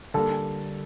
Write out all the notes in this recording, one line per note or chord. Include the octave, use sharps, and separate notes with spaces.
D3 G3 A#3 A4